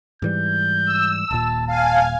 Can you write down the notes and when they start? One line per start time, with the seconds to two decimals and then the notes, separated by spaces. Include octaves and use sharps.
0.22 G#2 E3 G3 G6
0.85 E6
1.31 D#1 A#2 A5
1.67 F5 G#5 A5